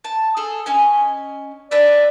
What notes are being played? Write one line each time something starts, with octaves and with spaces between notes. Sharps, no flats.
A5
G#4 A4
C#4 D#5 G#5
D4 B4 D5 E5